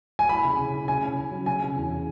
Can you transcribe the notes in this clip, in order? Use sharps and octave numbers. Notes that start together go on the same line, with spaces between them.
G#5
E4 B5
C#3
C#3
E4
C#3 G#5
C#4
C#4
F#3
C#3 G#5
C#4
E2
C#3